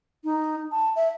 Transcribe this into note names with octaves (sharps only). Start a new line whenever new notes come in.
D#4
A5
E5